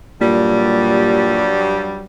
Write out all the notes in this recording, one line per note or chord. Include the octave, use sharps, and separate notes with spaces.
G2 A#2 F#3 G3